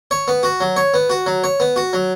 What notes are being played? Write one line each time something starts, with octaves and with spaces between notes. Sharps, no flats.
C#5
B3
F#4
F#3
C#5
B3
F#4
F#3
C#5
B3
F#4
F#3